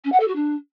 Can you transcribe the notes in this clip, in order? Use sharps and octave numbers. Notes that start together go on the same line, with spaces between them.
C#4
F#5
A4
F#4
D4